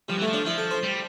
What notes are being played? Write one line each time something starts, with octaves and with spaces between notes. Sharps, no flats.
F3 G3
E3 A3
F3
D4
F3 E4
A4
C5
G3